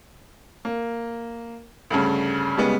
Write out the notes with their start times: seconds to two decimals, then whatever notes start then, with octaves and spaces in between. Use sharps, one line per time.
0.65 A#3
1.90 D2 G2 C#3
2.57 C#3 G3 G#3 B3